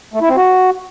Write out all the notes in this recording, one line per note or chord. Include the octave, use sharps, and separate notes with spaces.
A3
E4
C4
F#4